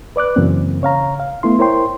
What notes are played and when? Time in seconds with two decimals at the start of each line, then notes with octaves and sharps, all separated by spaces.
0.16 B4 D5 D6 F#6
0.36 F#2 C#3 E3 A#3 C4
0.82 C#3 C#5 F5 A#5
1.20 F5
1.43 A3 B3 E4 C6
1.59 E4 A#4 C5 C#5 G5 C6